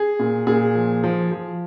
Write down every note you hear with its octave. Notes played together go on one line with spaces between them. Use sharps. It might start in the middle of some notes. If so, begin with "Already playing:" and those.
Already playing: G#4
A#2
A#2 G#4
F3
F3
F3